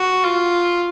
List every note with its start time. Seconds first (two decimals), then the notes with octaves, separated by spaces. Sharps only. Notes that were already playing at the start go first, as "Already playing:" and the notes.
Already playing: F#4
0.24 F4